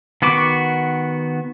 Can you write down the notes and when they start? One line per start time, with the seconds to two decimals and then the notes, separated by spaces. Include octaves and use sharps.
0.22 D#3 B3 F#4 D6